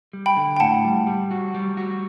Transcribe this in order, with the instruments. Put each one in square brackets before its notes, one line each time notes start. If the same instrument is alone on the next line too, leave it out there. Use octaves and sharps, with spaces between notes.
[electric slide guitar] G3
[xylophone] G5 B5
[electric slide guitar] D3
[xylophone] G5
[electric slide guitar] A2 [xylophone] F#5 A5
[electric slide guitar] G3
G3
F#4
G3
F#4